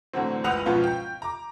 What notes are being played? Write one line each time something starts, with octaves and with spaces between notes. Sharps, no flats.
A2 D3 E3 F#3 C4
F#1 C#2 B4 F#5 D#6 F7
G#2 B2 F3 B3 C#4 F4
G5
A#5 D6